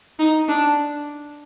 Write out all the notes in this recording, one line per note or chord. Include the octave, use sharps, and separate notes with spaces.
D#4
D4